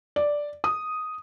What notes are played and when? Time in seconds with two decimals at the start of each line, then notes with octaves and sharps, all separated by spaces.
0.16 D5
0.64 D#6